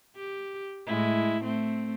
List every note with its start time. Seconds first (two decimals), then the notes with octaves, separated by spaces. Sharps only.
0.16 G4
0.86 A2 G#3 E4
1.42 A3 C4